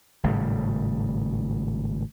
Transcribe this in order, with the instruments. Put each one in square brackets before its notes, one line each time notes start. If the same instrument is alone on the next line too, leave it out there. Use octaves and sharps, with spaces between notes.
[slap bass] G#1 A2 C#3 G3